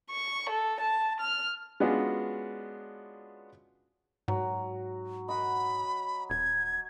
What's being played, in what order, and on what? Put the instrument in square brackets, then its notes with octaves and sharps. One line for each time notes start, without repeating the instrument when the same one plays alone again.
[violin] C#6
A4
A5
F6
[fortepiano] G#3 B3 C#4 D4 F4 F#4
[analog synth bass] G#2 [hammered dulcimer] F#3
[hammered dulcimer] D#5 F#5 [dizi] B5
[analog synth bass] D#1 [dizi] G#6